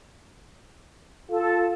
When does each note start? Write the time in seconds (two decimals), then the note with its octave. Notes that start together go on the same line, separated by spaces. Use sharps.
1.29 F4 A4